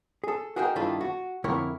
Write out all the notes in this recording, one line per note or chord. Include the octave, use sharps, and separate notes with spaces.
G#4 A4
F#4 G#4 A#4 D#5 E5 G5
G2 D#3 D4 E4 F4 A4
F#4
F2 D3 A#3 E4 A#4 C#5